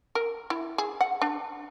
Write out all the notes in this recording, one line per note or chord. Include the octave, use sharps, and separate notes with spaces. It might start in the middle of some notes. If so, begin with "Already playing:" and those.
A#4
E4
G#4
F#5
D4